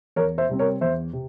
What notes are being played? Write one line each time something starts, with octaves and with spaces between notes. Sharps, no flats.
E2 A#4 C#5
C5 E5
C3 G3 C4
A#4 C#5
E2 C5 E5
C3